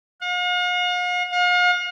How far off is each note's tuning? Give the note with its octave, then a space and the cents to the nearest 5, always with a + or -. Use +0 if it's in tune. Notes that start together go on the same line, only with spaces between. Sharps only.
F5 +45
F5 +40